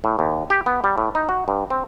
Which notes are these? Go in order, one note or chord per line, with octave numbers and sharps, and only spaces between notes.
A2
D#2
G4
B3
G3
A2
D#4
F#4
G2
C4